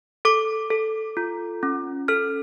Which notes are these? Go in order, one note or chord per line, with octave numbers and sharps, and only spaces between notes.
A4 D6
A4
F4
C#4
A4 F6